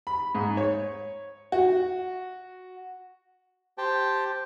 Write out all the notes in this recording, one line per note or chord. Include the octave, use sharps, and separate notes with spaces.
B5
G#2
C#5
F#4
G4 C5 G5 A5